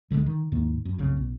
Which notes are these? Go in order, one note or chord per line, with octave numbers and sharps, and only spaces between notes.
C#2 D3 G3 G#3
D#3
D#2 G#2 D#3 A#3
F#2
F1 C2 F#2 C#3
B1